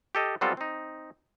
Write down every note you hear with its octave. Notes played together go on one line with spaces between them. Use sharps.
G4 A4 D#5
F#3 G3 B3 C4 F4 A4
C4 D#4